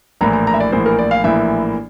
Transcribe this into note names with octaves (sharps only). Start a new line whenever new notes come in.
A#1 A2 E3 A#3 A#5
A#5
A#5
E5
D5
A#1 A2 E3 A#3 C5
A#4
D5
F5
A#1 A2 E3 A#3 E5